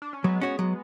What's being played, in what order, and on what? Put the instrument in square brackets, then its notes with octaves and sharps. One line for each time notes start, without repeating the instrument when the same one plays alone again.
[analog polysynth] D4
C#4
[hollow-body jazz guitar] F#3 [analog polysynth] G#3 B3
[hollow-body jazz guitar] C#4 F#4 C#5
F#3